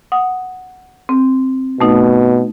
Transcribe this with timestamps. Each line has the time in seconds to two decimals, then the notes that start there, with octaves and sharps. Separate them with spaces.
0.12 F#5 D#6
1.09 C4
1.80 B2 A3 D#4